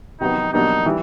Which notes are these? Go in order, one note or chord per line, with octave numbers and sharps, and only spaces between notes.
C3 D#3 F#3 B3 D#4
B2 F#3 A#3 D4 D#4 G4
E3 G3